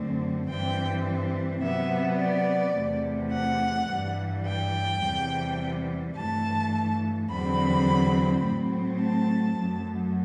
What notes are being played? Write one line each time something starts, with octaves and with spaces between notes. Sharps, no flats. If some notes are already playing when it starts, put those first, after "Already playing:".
Already playing: F#2 D3 A3 C4
G2 E3 G3 C4 G5
C3 F#3 B3 E5
D5
E2 C3 E3 A3
F#5
G2 E3 G3
G5
E2 C3 E3 G3
G2 E3 A3 A5
E2 D3 F#3 C4 B5
A2 F#3 A3 C4
A5
F#2 F#3 A3